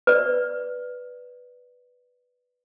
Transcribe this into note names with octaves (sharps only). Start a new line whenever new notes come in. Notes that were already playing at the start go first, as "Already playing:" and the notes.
B4 D5